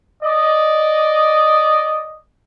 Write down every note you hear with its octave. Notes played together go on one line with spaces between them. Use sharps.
D5 D#5